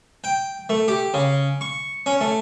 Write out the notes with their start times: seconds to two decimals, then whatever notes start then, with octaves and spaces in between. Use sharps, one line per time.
0.24 G5
0.69 A3
0.88 G4
1.14 C#3
1.61 C#6
2.06 C#4
2.21 A3